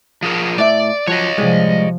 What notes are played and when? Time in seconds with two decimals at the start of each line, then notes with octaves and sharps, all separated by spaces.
0.23 F3 G#4 A#4
0.58 A2 D5 E5
1.07 F3 F#3 C#5 D#5
1.38 G#2 C3 F3 G3 G#3